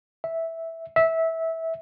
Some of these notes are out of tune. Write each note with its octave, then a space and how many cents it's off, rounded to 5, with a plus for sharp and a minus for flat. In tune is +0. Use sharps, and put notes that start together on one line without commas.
E5 -5
E5 -15